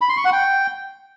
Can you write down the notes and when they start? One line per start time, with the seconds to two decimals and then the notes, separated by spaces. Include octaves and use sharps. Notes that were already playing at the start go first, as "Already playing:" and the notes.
0.01 B5
0.09 C6
0.17 C#6
0.25 F#5
0.33 G5